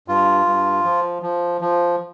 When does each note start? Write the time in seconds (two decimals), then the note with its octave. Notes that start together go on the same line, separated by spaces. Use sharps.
0.08 G2 F4
0.46 G2
0.84 F3
1.22 F3
1.61 F3